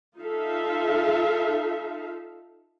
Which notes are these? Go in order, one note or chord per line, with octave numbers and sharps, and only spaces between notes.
D#4 F4 A4 E5 F5